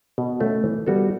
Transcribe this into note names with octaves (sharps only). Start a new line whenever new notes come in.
B2
A3 C#4
E3
G3 B3 F#4 A4